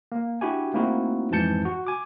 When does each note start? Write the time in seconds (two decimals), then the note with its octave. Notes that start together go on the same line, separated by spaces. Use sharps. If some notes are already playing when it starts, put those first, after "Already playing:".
0.12 A#3
0.41 D4 E4 F#4 G4 G#5
0.74 A3 A#3 C4 D#4 E4 F#4
1.31 F2 G#2 E3 A5 G6 C#7
1.65 F#4
1.87 G#5 D6